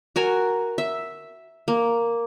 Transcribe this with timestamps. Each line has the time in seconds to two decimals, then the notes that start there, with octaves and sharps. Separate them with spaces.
0.16 F#4 A#4 G#5 A#5
0.78 E5
1.68 A#3